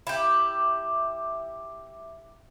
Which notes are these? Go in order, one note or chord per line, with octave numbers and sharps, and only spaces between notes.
E4 G4